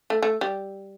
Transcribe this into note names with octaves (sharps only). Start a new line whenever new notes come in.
A3
A3
G3